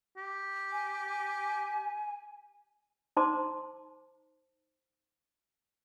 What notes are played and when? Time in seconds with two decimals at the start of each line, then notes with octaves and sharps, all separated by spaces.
0.17 G4
0.72 G#5
3.17 D#4 C5 A5 A#5 C6 D6